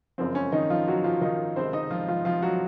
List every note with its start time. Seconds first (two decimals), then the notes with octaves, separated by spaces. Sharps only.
0.18 F#1 F#2 F3 C4
0.35 C#4
0.52 D#3 D#4
0.70 F3 F4
0.88 F#3 F#4
1.04 F3 F4
1.21 D#3 D#4
1.56 C#2 C3 D#3 C4 C5
1.73 D#4 D#5
1.91 F3 F4
2.08 F3 F4
2.25 F3 F4
2.42 F#3 F#4